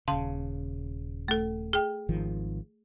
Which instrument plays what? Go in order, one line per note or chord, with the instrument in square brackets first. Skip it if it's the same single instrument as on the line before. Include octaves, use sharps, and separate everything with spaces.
[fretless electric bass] D#1 C#3 [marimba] F5 A5 C6
[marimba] A3 A4
G#4 G5
[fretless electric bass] G#1 D#3 F3